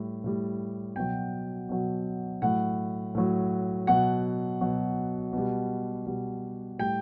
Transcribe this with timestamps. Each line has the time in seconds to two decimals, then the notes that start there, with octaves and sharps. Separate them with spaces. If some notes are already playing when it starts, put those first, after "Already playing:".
Already playing: A2 G3
0.24 A2 G3
0.96 B2 F#3 G5
1.69 B2 F#3
2.42 A2 F#3 F#5
3.15 A2 F#3
3.87 B2 F#3 F#5
4.61 B2 F#3
5.33 B2 G3
6.06 B2 G3
6.79 A2 G3 G5